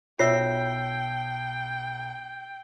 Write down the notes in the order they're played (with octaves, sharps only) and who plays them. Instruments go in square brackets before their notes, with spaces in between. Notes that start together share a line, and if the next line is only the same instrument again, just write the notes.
[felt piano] B1 E6 [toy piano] F4 C#5 E5 [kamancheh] G5 [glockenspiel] C7